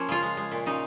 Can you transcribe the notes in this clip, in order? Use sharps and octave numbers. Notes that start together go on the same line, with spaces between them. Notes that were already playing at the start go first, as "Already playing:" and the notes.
Already playing: F3 A#3 C#4
C#3 F4
G#3
G#3
A#2
C#3 D#4